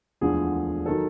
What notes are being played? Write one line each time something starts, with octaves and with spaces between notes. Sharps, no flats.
E1 D2 D3 F3 G#4
D#3 F#3 A4